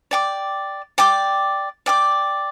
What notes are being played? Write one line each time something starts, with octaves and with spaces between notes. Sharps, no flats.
D5 G5 D6
D5 G5 D6
D5 G5 D6